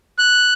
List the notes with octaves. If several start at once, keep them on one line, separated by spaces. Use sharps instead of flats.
F#6